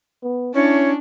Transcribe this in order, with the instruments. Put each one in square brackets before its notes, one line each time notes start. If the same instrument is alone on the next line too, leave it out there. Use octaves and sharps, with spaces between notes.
[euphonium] B3
[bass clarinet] C#4 [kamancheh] D4 [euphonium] E4 [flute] C#5